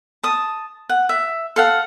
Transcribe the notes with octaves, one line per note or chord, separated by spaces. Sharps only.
A5 D#6
F#5
E5
A4 F5 F#5